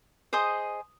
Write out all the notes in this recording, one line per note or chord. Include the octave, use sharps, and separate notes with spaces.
G#4 C5 D#5 D#6